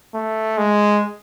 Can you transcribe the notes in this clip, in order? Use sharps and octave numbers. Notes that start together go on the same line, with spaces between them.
A3
G#3